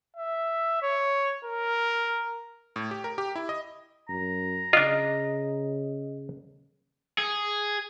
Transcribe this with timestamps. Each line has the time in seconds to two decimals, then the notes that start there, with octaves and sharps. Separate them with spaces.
0.17 E5
0.82 C#5
1.45 A#4
2.76 A2
2.91 G4
3.04 A#4
3.18 G4
3.35 E4
3.49 D#5
4.09 F#2 A#5
4.73 C#3 D4 F4 D#5
7.18 G#4